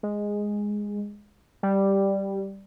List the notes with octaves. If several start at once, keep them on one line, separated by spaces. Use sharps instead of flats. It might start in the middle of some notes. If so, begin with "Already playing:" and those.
G#3
G3